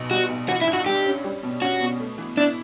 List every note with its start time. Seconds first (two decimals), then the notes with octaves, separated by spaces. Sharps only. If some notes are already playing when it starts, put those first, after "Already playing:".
Already playing: B1 B2
0.11 G3 F#4
0.30 B1
0.48 E3 F#4
0.62 E4
0.67 G2
0.73 F#4
0.86 G3 G4
1.06 C#4
1.24 G3
1.43 B2
1.61 C#4 F#4
1.80 B2
1.99 A3
2.18 E3
2.37 D4 E4